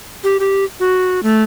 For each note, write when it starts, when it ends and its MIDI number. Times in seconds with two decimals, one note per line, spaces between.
0.24 0.37 67
0.40 0.64 67
0.80 1.23 66
1.23 1.43 57